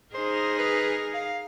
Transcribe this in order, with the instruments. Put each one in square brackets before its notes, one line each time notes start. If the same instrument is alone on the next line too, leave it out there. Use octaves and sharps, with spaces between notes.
[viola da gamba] D#4 G#4 A#4 [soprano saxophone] C5
[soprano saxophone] B4
F5